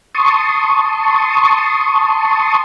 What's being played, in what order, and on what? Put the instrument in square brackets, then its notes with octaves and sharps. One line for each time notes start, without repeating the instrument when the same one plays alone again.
[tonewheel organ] A5 C6 C#6 D#6